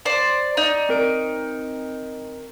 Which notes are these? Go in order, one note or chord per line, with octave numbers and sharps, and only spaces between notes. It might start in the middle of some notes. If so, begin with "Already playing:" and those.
C5 D5
D#4 D5
C4 A#4 D7